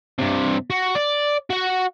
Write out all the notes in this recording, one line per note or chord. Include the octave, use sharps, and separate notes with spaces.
G2 C3
F#4
D5
F#4 F#5